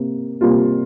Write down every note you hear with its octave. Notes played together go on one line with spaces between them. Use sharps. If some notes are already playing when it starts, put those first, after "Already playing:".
Already playing: C3 A#3
C3 G3 A#3 F4